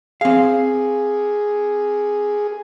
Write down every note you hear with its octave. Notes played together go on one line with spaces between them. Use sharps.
C4 G#4 F5